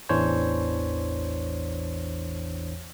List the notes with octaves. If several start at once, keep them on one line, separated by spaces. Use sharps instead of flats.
A1 E2 E3 D4 C5 C#5